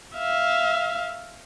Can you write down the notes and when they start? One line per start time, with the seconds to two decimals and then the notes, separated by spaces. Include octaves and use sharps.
0.16 E5 F5